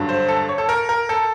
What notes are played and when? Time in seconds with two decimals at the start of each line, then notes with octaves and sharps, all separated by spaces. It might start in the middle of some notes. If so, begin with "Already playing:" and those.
Already playing: G2 D3 F#3
0.09 C5
0.28 A4
0.49 C#5
0.58 A4
0.69 A#4
0.89 A#4
1.09 A4